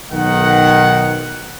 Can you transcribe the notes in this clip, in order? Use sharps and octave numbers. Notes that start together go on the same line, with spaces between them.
B1 D#3 F#5